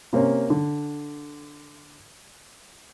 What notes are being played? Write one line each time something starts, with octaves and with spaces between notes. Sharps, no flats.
C3 A#3 C4 C#4
D3